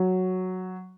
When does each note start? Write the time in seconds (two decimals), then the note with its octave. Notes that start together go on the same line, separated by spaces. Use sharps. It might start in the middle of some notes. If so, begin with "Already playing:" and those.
Already playing: F#3